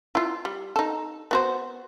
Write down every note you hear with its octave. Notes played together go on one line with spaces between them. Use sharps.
E4 F4
G3
D#4 A4
B3 F#4 C5